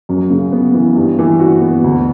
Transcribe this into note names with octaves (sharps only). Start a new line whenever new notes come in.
F#2
C#3
B3
E3
G2
E3
F#4
B3
D2